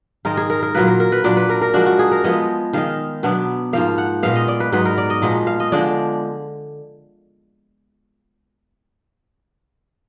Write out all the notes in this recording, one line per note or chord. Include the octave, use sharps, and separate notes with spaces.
G#2 D#3 G#3 D#4 A#4
G#4
A#4
A#4
A#2 F#3 A#3 B4
A#4
A#4
B4
A#2 F#3 D4 D5
B4
A#4
A#4
F3 G#3 D4 F#4
F#4
G#4
A#4
F3 G#3 B3 D#5
D#3 G#3 D#4 F5
B2 F#3 B3 D4
G#2 F3 A#3 F5
F#5
A#2 G#3 B3 F5
D#5
D5
B4
G#2 F#3 B3 D#4 B4
A#4
D5
D#5
A#2 F3 G#3 B3
F5
D#5
D3 F3 G#3 D4 D5